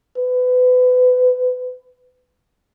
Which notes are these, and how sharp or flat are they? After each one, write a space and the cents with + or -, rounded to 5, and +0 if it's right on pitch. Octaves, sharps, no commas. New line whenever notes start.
B4 +30